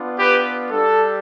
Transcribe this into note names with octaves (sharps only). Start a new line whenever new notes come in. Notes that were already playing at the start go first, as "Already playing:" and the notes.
Already playing: B3 D4 F4
G4 B4
G3 D4 G4 A4